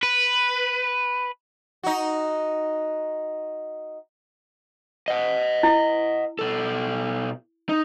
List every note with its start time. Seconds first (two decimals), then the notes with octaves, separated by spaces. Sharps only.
0.03 B4
1.83 D#4 F#4
5.08 D#5 F#5
5.63 E4
6.39 B2 A4
7.69 D#4